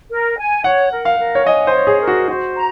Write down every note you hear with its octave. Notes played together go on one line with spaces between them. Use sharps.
A#4
G#5
C#5 F#5
A#4
F5
A#4
C#5
D#5 G#5
C5
C#5
G#4
A#4
F#4
F#4 C5
A#5